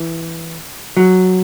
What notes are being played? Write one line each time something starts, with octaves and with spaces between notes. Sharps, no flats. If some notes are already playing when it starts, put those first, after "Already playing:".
Already playing: E3
F#3